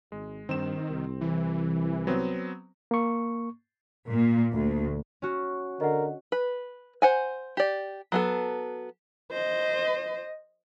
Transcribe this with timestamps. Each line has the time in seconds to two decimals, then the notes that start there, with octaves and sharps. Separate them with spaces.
0.12 G#1 G#3
0.49 G2 D#3 C4 E7
0.90 C2
1.21 E3
2.07 F#3 B3 C4
2.91 A#3 C#6
4.10 A#2
4.54 D2
5.22 C#4 F#4
5.81 D3 A#4 D#5 F#5
6.32 B4
7.02 C5 F#5 G#5
7.57 G4 D5
8.12 F#3 B3 A4
9.32 C5 D#5